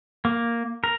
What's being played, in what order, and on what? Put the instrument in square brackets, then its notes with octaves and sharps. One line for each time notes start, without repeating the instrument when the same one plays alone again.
[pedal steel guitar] A#3
A#4